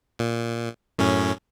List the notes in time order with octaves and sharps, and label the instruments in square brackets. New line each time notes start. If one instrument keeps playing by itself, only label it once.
[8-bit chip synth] A#2
F#2 A2 C#4